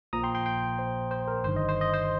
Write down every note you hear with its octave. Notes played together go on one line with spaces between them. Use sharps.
A#1 A#2 F3 A#3 A#5 D#6
G5 C6
G5 C6
G5 C6
C5
C5
A#4
G1 G2 D#3 C5
D#5
C5
D#5
C5